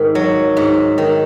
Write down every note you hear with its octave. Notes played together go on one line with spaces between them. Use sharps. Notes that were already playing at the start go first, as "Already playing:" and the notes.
Already playing: G#2 D#3
F#3
G#2
D#3